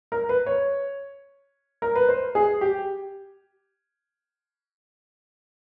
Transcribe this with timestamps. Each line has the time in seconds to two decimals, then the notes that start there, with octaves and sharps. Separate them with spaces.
0.12 A#4
0.29 B4
0.46 C#5
1.82 A#4
1.95 B4
2.09 C5
2.35 G#4
2.61 G4